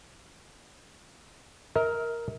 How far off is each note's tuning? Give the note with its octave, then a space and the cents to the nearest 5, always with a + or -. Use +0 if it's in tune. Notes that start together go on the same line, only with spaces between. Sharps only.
A#4 +0 E5 -45